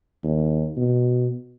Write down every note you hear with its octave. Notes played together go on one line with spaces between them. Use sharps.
D#2
B2